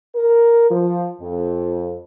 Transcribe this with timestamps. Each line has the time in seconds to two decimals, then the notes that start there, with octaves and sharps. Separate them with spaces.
0.15 A#4
0.71 F3
1.21 F2